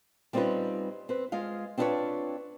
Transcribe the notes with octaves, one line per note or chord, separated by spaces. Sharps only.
G3 C4 C#4 D#4 F4 B4
C4 B4
G#3 F4 F5
C4 D4 F4 A4 B4 C#5